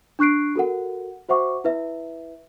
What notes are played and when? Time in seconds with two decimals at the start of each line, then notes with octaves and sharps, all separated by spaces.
0.19 D4 C#6 F#6 C7 D7
0.56 F#4 A4 A#4 F#5
1.29 F#4 C5 E5 F#5 C#6 D6
1.64 E4 B4 E5